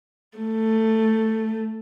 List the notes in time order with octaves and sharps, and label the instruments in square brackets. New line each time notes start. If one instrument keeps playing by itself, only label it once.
[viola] A3